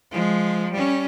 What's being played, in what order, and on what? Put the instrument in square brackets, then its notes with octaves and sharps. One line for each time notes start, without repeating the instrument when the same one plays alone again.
[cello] F3 G#3
G3 C#4